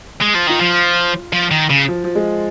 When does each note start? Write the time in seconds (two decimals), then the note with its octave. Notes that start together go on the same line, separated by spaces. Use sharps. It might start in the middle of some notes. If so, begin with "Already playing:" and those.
0.22 G#3
0.35 F3
0.48 D#3 F4
0.61 F3
1.33 F3
1.51 D#3
1.70 C#3
1.88 F3
2.04 F3
2.15 G#3